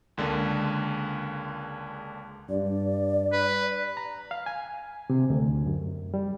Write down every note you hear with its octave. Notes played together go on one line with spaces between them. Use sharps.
C#2 D3 G#3 A#3
G2 D5
B4
A#5
F5
G#5
C3
D2
F#2
G3